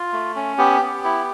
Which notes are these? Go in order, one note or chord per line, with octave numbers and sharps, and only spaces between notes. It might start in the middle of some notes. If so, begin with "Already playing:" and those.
Already playing: F4
A3
C#4
B3 G4
B3
E4